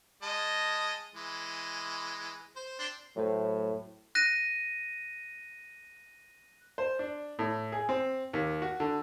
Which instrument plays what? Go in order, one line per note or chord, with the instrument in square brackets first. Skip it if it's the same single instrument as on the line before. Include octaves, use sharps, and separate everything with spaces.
[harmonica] G#3 D#5 A5
E3 G#3
C5
C4 D4 C6
[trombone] A2 [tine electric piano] F#3 A3 C5
[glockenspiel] F#6 A#6 D#7
[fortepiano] C5
D4
A2
G#4
C4
D#2
F#4
D3